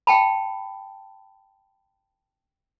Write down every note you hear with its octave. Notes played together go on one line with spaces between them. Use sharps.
G5 A5 B5